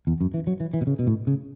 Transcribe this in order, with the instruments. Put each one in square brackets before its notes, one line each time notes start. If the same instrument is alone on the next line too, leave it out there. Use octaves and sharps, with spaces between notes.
[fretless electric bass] E2
F#2
E3
F#3
E3
E3
B2
C#3
B2
A2
C#3